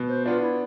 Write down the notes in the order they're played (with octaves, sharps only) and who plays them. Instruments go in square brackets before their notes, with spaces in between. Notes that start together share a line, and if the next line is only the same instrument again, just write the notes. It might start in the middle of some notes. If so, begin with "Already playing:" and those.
Already playing: [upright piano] B2
[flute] C5
[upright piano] B3 D4 [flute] F4
[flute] E4